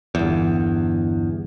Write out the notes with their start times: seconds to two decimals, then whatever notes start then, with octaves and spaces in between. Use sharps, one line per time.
0.15 G1 E2